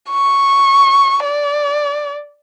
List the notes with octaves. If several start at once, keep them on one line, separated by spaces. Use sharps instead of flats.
C#6
D5